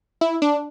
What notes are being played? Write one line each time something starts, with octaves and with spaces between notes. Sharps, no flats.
E4
D4